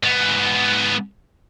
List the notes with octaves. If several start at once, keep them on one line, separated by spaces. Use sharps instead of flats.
G#2 B3